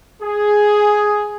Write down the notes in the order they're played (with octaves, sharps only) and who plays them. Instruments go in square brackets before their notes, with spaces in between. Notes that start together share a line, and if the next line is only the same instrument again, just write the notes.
[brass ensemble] G#4